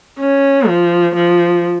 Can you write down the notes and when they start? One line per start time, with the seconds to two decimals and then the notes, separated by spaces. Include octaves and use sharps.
0.20 C#4
0.68 F3
1.15 F3